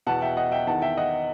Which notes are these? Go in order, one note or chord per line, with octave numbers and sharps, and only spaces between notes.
E2 B2 F#5 A5
E5 G5
D#5 F#5
E5 G5
E2 D#3 F#5 A5
E5 G5
D#5 F#5